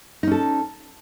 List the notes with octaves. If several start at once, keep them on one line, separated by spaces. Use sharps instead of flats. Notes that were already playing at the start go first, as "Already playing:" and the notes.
C#4 D#4 A4